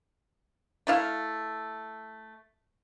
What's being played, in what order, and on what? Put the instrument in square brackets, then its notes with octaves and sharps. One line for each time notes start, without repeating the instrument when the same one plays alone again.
[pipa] A3 E4 F5